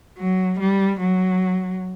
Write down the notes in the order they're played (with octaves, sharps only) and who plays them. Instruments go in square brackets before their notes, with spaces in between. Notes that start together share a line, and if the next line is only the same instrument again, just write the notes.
[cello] F#3
G3
F#3